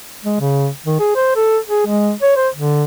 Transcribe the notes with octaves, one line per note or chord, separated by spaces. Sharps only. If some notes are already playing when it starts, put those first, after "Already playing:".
G#3
C#3
D#3
G#4
C5
A4
G#4
G#3
C#5
C5
D3